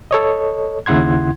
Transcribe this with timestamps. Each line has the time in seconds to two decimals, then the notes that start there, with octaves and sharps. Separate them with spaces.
0.11 A4 C#5 D#5
0.86 D#2 C#3 E4 F#5 C6 G#6